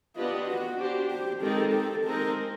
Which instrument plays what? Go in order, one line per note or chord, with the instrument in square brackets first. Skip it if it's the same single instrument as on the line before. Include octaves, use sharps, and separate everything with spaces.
[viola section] B3 D4 G4 B4 D#5 [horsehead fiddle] F4
[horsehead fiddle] F#4
[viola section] D4 G4 C5
[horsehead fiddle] G4
[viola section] D#3 G#3 C4 D#4 G4 [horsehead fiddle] A4
[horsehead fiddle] A4
[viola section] G#3 C4 D#4 [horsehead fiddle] A#4